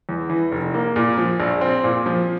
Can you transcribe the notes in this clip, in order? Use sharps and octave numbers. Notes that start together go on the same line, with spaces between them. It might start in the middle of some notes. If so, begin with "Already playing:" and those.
E2
E3
F1
A#3
A#2
F3
A#1
C4
A#2
F3